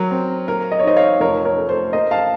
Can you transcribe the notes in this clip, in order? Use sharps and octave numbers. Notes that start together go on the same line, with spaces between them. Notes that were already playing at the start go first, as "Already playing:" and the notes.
Already playing: F#3 A#4
C4
A#3 A#4
D#5
C#5
D#4 C5 D#5
C#5 F5
F1 A#4 C#5
A#4 C#5
A3
A4 C5
A#3 C5 D#5
F5 A5